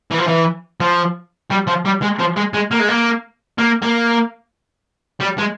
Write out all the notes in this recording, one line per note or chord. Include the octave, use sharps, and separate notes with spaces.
E3
F3
E3
F3
G3
F3
G3
G#3
F3
G#3
G#3
A#3
G#3
A#3
A#3
A#3
G3
G#3